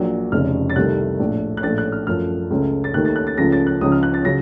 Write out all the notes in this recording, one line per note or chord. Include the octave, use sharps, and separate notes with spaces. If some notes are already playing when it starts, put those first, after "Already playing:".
Already playing: A#1 A#2 F#3
F1 F2 C#3 F6
A6
C2 C3 D#3 A3 F#6
A#1 A2 A3
F#6
A#1 A2 A3 A6
F#6
F6
F#2 F3 A3 F6
C#2 C#3 A3
A6
D#2 D#3 A3 F#6
A6
F#6
A6
C#2 C#3 F3 A3 A#6
A6
F#6
C#2 C#3 F3 D#6
F6
F#6
A6
C#3 F#3 A#6